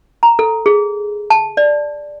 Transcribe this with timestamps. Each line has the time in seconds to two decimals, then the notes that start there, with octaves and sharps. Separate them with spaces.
0.23 A#5
0.39 A4
0.66 G#4
1.30 A5
1.57 D5